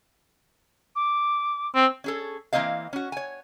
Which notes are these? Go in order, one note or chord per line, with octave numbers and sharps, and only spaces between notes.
D6
C4
C#4 G#4 A4
E3 A3 A#3 C4 D#5 F5
C#4 F#4
C#5 G#5